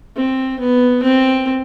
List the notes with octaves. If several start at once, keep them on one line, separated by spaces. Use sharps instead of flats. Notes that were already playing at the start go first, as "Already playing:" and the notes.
C4
B3
C4